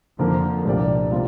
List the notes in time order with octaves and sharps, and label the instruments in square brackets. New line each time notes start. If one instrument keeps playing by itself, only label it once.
[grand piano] F2 D3 A#3 D4 A#4 [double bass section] F3
[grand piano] C2 A#2 A#3 G4 D5
C3 G3 A#3 F4